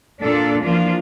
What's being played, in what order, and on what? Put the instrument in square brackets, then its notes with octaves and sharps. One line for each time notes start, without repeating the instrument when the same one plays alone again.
[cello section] A#2 D4 F4 A4
E3 F3 A#3 D4 F4